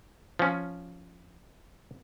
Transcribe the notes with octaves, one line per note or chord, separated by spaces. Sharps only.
F3 C#4